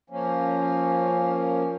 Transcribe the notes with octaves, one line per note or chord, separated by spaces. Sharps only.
F3 A#3 C#4